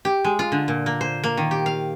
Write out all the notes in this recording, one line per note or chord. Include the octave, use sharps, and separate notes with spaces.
G4
G#3
F4
D3
A#2
A#3
C5
A#3
D#3
G4
F5